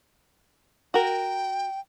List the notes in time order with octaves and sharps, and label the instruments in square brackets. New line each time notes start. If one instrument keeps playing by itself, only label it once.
[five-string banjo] F#4 A#4 [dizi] G5